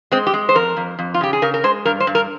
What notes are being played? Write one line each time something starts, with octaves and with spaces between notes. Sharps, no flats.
G#3 C4
G4
G#3
C5
F2 A#4
F2
F2
F4
C#3 G4
G#4
C#3 A#4
A#4
G#3 C5
G2 A#4
C5
G2
A#4